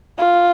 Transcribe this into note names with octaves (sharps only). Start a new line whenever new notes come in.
F4